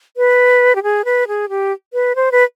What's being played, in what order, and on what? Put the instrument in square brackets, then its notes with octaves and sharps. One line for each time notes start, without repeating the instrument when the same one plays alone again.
[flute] B4
G4
G#4
B4
G#4
G4
B4
C5
B4